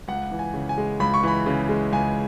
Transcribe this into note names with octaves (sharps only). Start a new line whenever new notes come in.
C#2 F#5
E3
G#5
C#3
G#5
G#3
C#2 B5
C#6
E3 B5
C#3
G#3
C#2 G#5